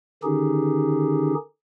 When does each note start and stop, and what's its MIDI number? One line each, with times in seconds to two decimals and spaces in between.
0.23 1.35 50
0.23 1.35 51
0.23 1.35 61
0.23 1.35 63
0.23 1.35 67
0.23 1.35 68